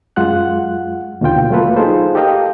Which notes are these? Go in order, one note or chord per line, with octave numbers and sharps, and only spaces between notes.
F#2 G#3 F4 F#5 F#6
D#2 B2 D3 F4 G5
F#3 A3 A#3 F4 A4 B4
D#4 F4 G#4 A4 C5
G4 A4 A#4 D#5 F5 G5